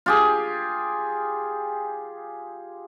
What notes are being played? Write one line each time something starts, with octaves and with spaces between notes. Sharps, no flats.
F4 G4 G#4